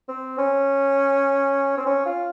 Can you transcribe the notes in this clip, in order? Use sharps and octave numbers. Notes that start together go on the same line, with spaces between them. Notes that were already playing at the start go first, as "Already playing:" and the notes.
C4
C#4
C4
C#4
F4